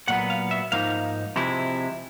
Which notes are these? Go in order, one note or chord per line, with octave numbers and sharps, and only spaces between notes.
A#2 F#3 B3 F#5
F5
E5
G#2 F3 A#3 D#4 F5
C3 F3 G#3 C4 E4